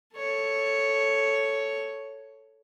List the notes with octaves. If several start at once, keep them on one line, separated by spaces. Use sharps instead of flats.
A4 C#5